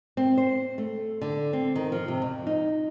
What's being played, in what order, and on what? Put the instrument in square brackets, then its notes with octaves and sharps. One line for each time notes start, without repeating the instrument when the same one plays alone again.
[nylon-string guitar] C4
C5
A3
D3
C4
D#3
F3
C3
F2
D#4